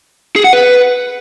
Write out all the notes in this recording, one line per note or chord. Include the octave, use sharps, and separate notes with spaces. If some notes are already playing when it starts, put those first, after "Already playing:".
G#4
F#5
B4